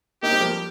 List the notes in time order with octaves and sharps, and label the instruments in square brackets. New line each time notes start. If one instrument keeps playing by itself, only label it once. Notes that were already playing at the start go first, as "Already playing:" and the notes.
[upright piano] A#3 D#4 [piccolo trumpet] G4
[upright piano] G3 C4
F3 A#3
G3